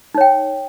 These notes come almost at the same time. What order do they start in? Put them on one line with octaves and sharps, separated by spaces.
D#4 C#5 G5